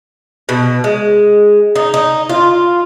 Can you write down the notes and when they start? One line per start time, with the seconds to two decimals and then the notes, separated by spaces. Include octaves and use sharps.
0.49 B2
0.84 G#3
1.75 D#4
1.94 D#4
2.29 F4